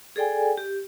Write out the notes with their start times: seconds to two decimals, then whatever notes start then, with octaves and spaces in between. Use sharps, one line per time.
0.16 G#4 A4 D5 G5 G#5
0.57 G4